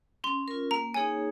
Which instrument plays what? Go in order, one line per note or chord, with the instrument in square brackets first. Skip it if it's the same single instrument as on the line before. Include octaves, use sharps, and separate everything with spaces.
[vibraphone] C#4 [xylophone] C6
[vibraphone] F4 A#4
[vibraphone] A#3 [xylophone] A#5
[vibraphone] D#4 G#4 C#5 [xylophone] G#5